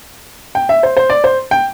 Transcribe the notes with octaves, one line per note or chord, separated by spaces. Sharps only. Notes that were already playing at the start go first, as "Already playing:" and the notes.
G5
E5
C5
C5
D5
C5
G5